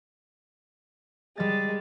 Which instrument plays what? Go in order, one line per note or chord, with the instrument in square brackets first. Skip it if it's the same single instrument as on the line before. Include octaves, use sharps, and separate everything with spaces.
[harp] G3 A6 [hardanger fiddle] G#3